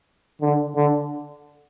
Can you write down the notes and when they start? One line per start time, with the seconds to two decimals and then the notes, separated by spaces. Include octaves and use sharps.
0.42 D3
0.76 D3